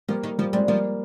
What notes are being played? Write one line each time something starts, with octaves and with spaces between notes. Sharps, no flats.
F3 G3 A#3
D#3
F3 G3 A#3
G3 G#3 C4
F3 G3 A#3